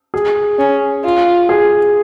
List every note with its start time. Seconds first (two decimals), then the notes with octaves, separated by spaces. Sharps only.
0.14 G#4
0.59 C#4
1.04 F4
1.49 G#4